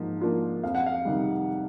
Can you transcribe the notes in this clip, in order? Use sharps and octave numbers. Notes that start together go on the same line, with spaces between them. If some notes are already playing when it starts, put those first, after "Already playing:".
Already playing: G#2 F3 A#3
F3 A#3 D4 F4
F2 F5
F#5
F5
C3 D#3 G3